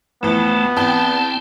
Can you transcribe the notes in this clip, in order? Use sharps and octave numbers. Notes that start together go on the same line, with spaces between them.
F2 E3 A3 B3
E2 C4 G5 A5